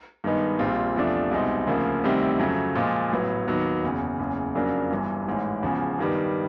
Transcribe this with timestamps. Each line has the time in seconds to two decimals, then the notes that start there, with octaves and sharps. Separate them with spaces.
0.24 G2 D#3 G#3 B3 D#4
0.59 A#1 A#2 G3 C4 F4
0.96 E2 C3 F3 A3 D4
1.31 C2 B2 G#3 C4 D#4
1.67 D2 C#3 F3 A#3
2.04 D2 C3 D#3 G3 C4
2.39 F2 C#3 F#3 A3
2.75 A#2 F3 G#3
3.11 A1 A2 F#3 B3
3.47 D#2 D#3 F#3 B3
3.83 F#1 E2 C#3
4.19 F#1 E2 C#3
4.55 F2 C#3 F#3 A#3 D4
4.91 G1 G2 E3
5.27 A1 G#2 E3
5.63 E1 E2 C#3 F3
5.99 G2 D#3 G3 B3